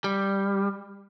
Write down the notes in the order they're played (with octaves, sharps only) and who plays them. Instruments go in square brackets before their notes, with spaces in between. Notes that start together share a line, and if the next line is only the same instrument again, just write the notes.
[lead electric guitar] G3